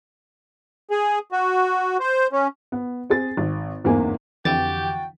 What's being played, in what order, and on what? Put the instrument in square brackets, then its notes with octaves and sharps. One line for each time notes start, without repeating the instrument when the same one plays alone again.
[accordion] G#4
F#4
C5
C#4
[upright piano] B3
C4 G#4 A6
G#1
G1 E2 G#2 A#3 C4 G#5
[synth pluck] F2 D3 E3 [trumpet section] F#4 G5 [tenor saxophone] G4 [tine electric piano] A6